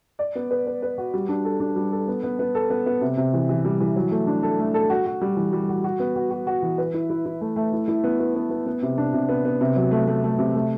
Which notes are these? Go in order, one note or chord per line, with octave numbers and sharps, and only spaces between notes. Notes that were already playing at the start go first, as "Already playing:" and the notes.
D5
B3
B4
B4
B4
F#4
G3
D4
A4
D4
G3
A4
B3
B3
B3
A4
B3
B3
C3
C3
E3
E3
G3
E3
F#3
A3
D4
A4
A3
A4
F#4
F#4
G3
E3
G3
F#4
F#4
B3
F#4
F#4
F#4
E3
B4
E4
E4
E4
A3
A3
E4
E4
B3
B3
B3
B3
B3
C3
D4
C3
B3
B3
C3
F#3
A3
A3
A3
C3
A3